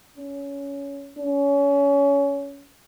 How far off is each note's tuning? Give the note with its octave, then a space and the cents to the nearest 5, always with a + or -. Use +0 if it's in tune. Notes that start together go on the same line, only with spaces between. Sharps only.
C#4 +15
C#4 +25